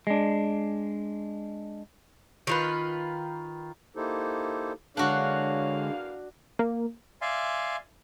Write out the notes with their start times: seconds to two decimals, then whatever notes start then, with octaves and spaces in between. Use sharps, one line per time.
0.07 G#3 D4
2.47 D#3 F4 B4
3.96 A#3 D#4 E4 G4 A4 C5
4.97 E2 D3 G#3 A#3 D4 F#4 C#5 F5
6.59 A#3
7.22 D5 E5 F5 G#5 C6